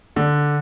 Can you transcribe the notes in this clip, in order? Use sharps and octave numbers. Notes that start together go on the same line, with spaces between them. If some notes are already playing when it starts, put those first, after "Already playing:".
D3